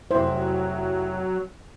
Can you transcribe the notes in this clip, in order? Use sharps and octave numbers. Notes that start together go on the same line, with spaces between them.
F1 F#3 E4 C5